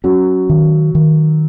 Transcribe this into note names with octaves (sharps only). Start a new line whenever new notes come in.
F#3 C#4
D#3
D#3